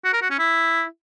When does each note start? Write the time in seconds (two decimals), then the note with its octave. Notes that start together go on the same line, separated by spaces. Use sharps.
0.05 F#4
0.13 A#4
0.22 F#4
0.30 C#4
0.39 E4